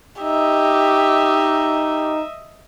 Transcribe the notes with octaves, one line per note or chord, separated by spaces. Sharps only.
D#4 G4 D#5 E5